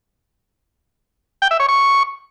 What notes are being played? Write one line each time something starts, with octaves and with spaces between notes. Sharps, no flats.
G5
E5
C#5
C#6